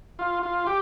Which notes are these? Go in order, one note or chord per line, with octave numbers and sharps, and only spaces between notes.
F4
F4
G4